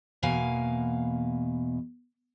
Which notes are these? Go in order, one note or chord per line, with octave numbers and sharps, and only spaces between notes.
E2 B2 A#3 F5 G#5